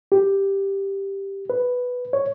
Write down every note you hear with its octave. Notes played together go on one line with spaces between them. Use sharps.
G4
B4
C#5